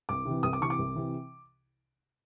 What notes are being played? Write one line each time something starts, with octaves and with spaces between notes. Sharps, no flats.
C2 D6
C3 E3
C2 D#6
D6
C3 E3 C#6
D6
C2
C3 E3